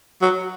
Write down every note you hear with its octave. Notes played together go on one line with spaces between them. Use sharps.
F#3